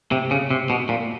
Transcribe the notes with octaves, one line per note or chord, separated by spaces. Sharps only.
C3
C#3
C3
B2
A#2